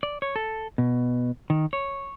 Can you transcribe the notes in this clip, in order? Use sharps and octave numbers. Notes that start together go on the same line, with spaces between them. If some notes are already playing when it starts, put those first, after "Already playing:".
D5
C#5
A4
B2
D#3
C#5